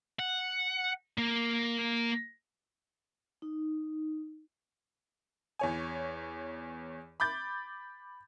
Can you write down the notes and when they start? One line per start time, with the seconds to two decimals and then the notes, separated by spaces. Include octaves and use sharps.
0.19 F#5
1.18 A#3
3.42 D#4
5.59 E2 C#5 G#5
7.20 B5 D6 G6 A6